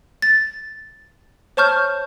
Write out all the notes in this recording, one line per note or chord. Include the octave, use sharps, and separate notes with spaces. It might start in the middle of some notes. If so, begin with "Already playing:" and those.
A6
C5 C#5 A5 C#6 F6 G6